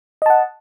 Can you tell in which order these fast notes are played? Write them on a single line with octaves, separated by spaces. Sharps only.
D#5 A5 F#5